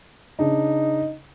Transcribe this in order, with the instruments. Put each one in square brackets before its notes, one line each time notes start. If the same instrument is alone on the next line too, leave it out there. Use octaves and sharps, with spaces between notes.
[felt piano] C#3 D4 [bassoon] D#4